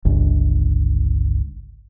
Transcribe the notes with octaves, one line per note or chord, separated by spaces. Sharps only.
G1 C#2